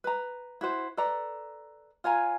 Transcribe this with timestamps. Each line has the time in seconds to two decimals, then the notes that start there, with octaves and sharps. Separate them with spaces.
0.04 B4 A#5
0.61 E4 F#4 C5
0.97 A4 B4 D5 A#5
2.04 F4 C#5 G#5 A#5